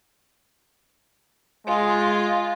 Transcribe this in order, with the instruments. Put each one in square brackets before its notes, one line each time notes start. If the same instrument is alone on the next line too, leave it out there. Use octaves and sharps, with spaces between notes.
[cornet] G#3 [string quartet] F4